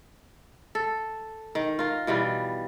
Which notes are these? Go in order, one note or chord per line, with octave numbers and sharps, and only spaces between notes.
A4
D#3
F4 A#4
B2 E3 G3 F4